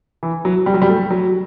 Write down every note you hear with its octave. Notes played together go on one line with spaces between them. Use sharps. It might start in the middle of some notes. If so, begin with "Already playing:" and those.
E3
F#3
G3
F#3
G3
A3
F#3